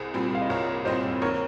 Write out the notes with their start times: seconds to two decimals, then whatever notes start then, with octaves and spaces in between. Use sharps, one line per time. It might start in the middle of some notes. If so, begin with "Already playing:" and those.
Already playing: C2 G#4 C5
0.14 A#2 G3 C4
0.35 F5
0.42 D#5
0.49 C2 A#4 C#5
0.85 A#2 G3 C4 C5 D#5
1.22 D#2 A#4 C#5